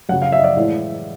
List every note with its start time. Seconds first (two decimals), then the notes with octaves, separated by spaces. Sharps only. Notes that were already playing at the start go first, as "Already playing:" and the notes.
0.09 F#2 C#3 F#3 F#5
0.22 F5
0.32 E5
0.39 D#5
0.44 D5
0.57 A2 E3 G#3